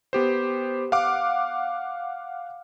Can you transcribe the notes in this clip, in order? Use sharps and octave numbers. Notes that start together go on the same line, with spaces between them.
B3 G4 C5
F5 F#5 D6